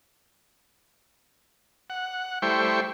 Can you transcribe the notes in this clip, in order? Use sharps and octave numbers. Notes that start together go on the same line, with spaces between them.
F#5
G3 A3 E4 C5 G5 C#6